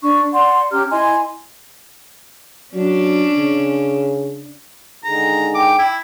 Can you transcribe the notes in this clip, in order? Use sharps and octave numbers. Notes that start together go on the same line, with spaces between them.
D4 C#6
D5 F#5 C6
C#4 G4 A#5 F6
E4 D#5 G#5 C6
F#3 C#4 D4
C#3
D3 D#3 G#3 A#5
G5 D6
E4